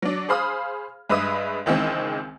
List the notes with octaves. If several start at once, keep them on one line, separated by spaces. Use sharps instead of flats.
F#3 D4
G#4 C5 F5 B5 D#6 F6
G2 G#3 B4 E5 D#6
C#2 D#3 E3 G#3 C4